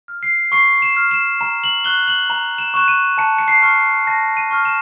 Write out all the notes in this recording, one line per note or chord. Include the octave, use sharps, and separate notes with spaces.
F6
C7
C#6 C7
E7
F6
E7
A#5 E7
F#7
C#6 F#6 G7
F#7
A#5
E7
C#6 F#6 E7
D#7
A5 C#7
C#7
C7
C#6 F6
A5 A#6
D#7
C#6 F6
E7